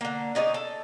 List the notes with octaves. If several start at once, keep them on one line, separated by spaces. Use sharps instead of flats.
D3 A#3
C#4 D#4 G#4 D5
A4